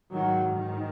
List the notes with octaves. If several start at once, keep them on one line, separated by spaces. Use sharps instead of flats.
G#2 D#3 F#3
D#3